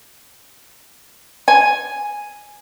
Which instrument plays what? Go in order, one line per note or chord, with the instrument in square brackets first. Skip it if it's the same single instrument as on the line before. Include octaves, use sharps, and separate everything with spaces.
[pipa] G#5